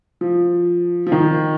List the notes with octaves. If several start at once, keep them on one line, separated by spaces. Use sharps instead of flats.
F3
F3
D#3